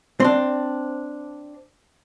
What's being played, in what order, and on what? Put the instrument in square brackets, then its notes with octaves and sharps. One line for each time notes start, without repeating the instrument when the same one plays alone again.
[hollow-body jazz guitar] C4 D4